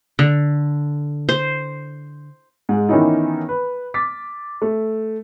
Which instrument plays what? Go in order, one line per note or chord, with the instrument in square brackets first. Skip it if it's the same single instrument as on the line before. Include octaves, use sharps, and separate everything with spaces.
[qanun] D3
C5
[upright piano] G#2 G#3
D#3 E3 B3 C#4 D#4 E4
B4
D6 A6 B6
A3